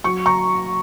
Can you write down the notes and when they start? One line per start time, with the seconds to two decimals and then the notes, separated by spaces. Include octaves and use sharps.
0.04 F#3 C#6
0.26 A#5 C#6